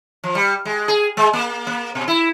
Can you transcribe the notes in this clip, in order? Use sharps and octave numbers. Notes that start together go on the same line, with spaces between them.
F3
G3
G#3
G#4
G#3
A#3
A#3
B2
E4